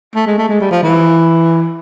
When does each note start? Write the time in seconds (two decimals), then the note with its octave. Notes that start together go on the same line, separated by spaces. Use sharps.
0.15 A3
0.27 G#3
0.38 A3
0.49 G#3
0.60 G3
0.71 F3
0.83 E3